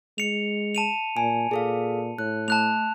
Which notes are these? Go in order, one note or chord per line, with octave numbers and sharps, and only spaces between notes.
G#3 C#7 F7
A5 D#7 F7
A#2 G#5
A#2 G#4 A4 F5
A2 F#6
A3 A5 F#6 F7